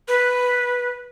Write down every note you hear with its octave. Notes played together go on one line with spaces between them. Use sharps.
B4